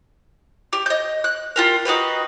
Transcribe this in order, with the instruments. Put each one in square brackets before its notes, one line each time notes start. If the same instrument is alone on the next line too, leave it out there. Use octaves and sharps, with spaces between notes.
[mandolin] G4
D#5 G6
F#6
F4 G4 A#4
D#4 F#4 G4 B4